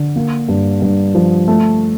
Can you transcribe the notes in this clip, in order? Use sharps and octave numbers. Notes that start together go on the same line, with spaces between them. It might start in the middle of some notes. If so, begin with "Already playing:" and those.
Already playing: D3
A#3
G2
G2
F3
A3